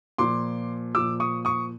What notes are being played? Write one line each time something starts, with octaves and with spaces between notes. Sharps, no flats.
A#2 F3 C6 D6
A#2 F3 D6 E6
C#6 D#6
C#6 D#6